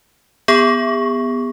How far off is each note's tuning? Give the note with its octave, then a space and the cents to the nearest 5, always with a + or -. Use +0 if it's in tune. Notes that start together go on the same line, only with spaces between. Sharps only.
B3 +0 G#4 -45 C#6 +0